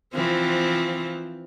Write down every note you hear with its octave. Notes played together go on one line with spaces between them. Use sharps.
E3 F3 C4